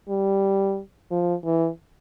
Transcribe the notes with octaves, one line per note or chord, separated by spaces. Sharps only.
G3
F3
E3